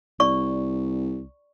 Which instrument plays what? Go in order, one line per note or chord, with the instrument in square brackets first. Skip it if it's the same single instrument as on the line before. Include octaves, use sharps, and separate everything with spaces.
[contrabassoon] C2 [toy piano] D5 C#6